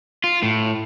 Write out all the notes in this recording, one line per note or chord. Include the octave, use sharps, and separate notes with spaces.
F4
A2